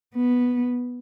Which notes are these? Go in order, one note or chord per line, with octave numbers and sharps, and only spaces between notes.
B3